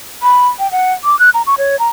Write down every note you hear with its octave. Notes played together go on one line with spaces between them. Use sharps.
B5
G5
F#5
D6
F#6
A#5
C#6
C#5
A#5